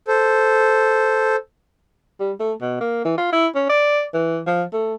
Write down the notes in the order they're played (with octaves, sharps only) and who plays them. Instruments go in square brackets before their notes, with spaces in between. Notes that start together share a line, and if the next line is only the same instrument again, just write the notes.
[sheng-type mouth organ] A4 C5
[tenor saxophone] G3
A3
B2
A#3
E3
F4
E4
C#4
D5
E3
F3
A3